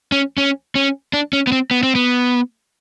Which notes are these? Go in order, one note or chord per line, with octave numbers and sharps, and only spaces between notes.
C#4
C#4
C#4
D4
C#4
B3
C4
B3
C4
B3